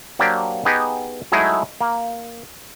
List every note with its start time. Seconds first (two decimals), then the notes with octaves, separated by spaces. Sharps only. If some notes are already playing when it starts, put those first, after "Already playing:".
0.19 F#3 A#3 D4 G4 C5 D5
0.65 B3 D#4 G4 G#4 D#5
1.32 F#3 G#3 A3 D#4 E4 G#4
1.81 A#3